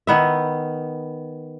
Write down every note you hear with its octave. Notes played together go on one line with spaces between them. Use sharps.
D#3 B3 E5